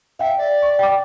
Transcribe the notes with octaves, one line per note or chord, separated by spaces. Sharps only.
E5 F5 G5
D5
C#6
G5 D6